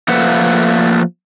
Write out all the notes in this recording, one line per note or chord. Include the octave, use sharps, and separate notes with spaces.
F3 A3 A#3 B4 E5 F#5